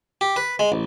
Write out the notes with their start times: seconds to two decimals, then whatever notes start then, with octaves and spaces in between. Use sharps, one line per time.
0.21 G4
0.36 B4
0.59 G#3
0.72 A1